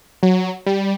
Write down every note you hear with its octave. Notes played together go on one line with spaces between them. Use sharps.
F#3
G3